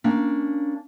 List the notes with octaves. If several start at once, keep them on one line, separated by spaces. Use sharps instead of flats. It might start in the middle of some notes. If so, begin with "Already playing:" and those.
A#3 C#4 D4